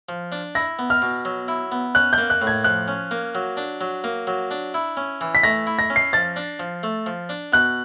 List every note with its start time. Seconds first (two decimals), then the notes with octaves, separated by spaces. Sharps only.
0.09 F3
0.32 D4
0.55 E4 A#6
0.79 B3
0.90 F6
1.02 B2
1.25 F#3
1.48 E4
1.72 B3
1.95 C#4 F#6
2.13 G6
2.18 A#3
2.30 F#6
2.42 A2
2.47 G#6
2.64 F3 F#6
2.88 C#4
3.11 A#3
3.35 F#3
3.57 D4
3.81 F#3
4.04 A#3
4.27 F#3
4.51 D4
4.74 E4
4.97 C#4
5.21 E3
5.35 B6
5.43 A3 A#6
5.67 E4
5.79 A#6
5.90 C#4
5.96 C7
6.13 F3 A6
6.36 D4
6.59 F3
6.83 A3
7.06 F3
7.29 D4
7.53 B2 F#6